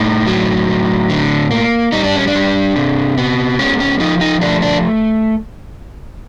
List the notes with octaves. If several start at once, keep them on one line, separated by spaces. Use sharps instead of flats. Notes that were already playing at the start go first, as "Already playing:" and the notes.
Already playing: A2 D#4
F#3
A2
D3
A#3
G3 D#4
D4
C#4
D4
G3
C3
B3
G#3 C#4
C#4
F3 D#4
D#4
A3 D4
D4